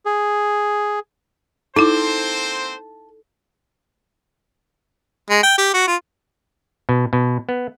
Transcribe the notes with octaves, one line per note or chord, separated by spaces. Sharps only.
G#4
A#3 C4 D#4 E4 A4 C5
G#3
G5
G4
F#4
F4
B2
B2
B3